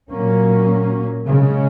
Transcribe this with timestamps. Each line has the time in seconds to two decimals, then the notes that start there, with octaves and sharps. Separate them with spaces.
0.11 A#2 F#3 A#3 C#4
1.26 C#3 G#3 C#4